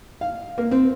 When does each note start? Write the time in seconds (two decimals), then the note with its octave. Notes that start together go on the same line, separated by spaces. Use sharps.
0.21 F5
0.58 A#3
0.71 C4